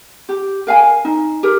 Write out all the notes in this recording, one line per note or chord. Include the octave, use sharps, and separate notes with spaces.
G4
A#4 F5 G#5
D#4
G4 A#4